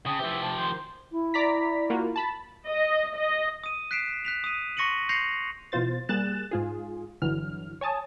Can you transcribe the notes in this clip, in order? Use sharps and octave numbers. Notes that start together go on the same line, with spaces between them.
C#3 G5 A5 D#6
E3 F3 G4 C5 E5
C3 A5
D#3 C5
E4
D5 A#5 B6
A#3 F4 F#4
A5 B5
D#5
D#5
D#6 D#7
F#6 B6 C7 D7 E7
F#6 B6 F7
D#6 D#7
C6 C#6 A#6 C#7 D#7 F#7
C6 G6 A#6 C7 C#7 F7
B2 E3 F4 C5 A6
G3 A#3 G#4 F#6 A6 E7
G#2 F4 G#4
G1 D3 E3 F#3 F6
C#5 G#5 A5 D#6